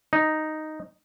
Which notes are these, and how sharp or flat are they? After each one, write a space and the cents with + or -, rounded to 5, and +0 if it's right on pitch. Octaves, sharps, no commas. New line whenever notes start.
D#4 -5